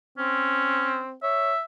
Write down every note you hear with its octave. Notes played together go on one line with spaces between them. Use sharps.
C4 C#4
C#5 E5